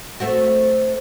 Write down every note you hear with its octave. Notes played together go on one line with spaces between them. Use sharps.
A3 C4 F#4